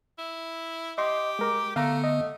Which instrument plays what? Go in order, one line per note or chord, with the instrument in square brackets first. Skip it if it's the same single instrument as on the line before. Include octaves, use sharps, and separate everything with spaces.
[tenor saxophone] E4
[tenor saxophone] G4 [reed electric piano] D#5 C6
[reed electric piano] G#3 A#4 D6
[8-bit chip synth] D3 B3 [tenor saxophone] A3 [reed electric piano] F5 A#5
[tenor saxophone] A3 [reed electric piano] D#5